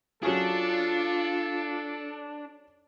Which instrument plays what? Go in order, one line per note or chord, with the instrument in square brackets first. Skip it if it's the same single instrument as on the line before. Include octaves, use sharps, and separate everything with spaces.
[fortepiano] F#3 C#4 G#4 [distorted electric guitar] D4 [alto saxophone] F4 [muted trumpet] A4